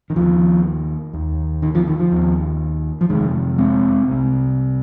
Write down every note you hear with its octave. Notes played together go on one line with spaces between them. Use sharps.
D#3
D#2 F3
D#2
D#3
F3
D#3
F3
D#2
F3
F2 C3 D#3 G#3
G#3 C4
C2 C3